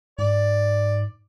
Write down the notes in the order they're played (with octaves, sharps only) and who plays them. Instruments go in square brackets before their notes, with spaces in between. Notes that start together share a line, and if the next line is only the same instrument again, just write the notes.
[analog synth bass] G#2 [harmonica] D5